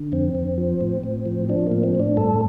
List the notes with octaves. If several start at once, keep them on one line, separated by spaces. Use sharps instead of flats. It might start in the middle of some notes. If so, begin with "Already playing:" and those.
Already playing: D3
F2 C4
F2
F3
A2
A2
F3
F3 D4
A2 A#3
C4
A2 D4
G2 A4